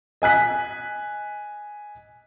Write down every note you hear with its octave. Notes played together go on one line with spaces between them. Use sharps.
D#5 G#5 F#6 B6